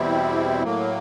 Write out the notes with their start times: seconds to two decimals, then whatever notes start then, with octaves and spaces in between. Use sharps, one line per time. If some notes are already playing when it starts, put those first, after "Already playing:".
Already playing: E2 B2 G3 C4 E4
0.64 A2 F#3 A#3